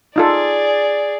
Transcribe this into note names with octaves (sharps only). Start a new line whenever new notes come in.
D#4 F4 G#4 A4 D5